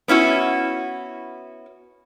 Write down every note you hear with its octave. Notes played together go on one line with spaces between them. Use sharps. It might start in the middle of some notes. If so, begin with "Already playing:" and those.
B3 C#4 E4 F#4